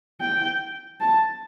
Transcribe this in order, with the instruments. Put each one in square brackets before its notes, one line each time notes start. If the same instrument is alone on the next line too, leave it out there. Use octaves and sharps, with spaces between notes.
[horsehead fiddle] G5
A5